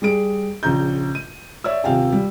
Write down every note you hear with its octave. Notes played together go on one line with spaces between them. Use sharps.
G3 G#4 D7
A#1 C#3 A#5 G6
D#7
C#5 D5 E5 E6
D#1 C3 F5 G5 G#5
G3